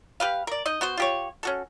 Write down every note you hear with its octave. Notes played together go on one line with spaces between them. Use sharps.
G4 B4 F5
A#4 D5
D#4 D#5
B3 F#4 C5
F4 G4 C#5
C#4 F#4 A4